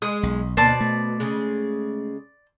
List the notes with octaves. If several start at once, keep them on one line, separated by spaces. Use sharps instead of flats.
G#3 D#6
B1
D2 B2 A#3 C5 D5 A5
A3
C#3 G#3